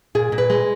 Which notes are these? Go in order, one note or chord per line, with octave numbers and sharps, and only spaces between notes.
A#2 G#4
A#2
B4
G#3